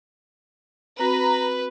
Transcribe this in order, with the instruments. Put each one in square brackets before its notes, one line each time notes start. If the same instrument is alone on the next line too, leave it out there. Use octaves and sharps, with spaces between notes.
[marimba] C4 F#4 [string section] B4 [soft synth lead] A#5